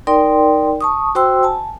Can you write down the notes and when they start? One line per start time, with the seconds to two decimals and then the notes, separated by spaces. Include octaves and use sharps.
0.07 D#4 A#4 D5 G5 C6
0.81 A5 C#6 D#6
1.15 F#4 C5 G5 C6 E6
1.43 G#5 A5